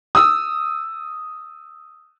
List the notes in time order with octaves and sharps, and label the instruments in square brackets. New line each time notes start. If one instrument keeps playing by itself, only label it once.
[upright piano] D#6 E6